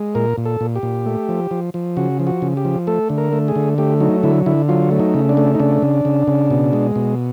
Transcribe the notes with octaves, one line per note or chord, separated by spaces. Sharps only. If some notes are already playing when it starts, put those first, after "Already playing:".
Already playing: G#3
A#2 A#4
A#2
A4
A#2
G4
A#2
A3
F3
F3
F3
C#3 F#4
F3
F#4
C#3
G4
F3
A3 A4
D3
A#4
A3
G#4
D3
A3 G4
F#3 D#4
D3 E4
D3 E4
F#3 F4
A3
D#4
C#3
D4
A3
D#4
C#3 D4
C#3
C#3
C#3
B2
G#3
B2